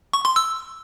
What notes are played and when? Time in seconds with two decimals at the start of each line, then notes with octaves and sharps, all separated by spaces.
0.13 C#6
0.25 C6
0.36 E6